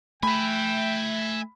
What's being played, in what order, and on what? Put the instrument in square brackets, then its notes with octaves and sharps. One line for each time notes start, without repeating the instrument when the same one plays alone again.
[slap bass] A3 [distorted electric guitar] E5 G#5 [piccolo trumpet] G5 [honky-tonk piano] B5